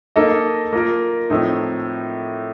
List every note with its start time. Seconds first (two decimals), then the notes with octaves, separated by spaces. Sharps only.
0.16 A#3 D#4 A4 D#5
0.73 A#3 F4 A#4
1.30 A2 F3 A3 C4 D#4